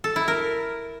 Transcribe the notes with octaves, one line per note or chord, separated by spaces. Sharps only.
A4
E4
A#4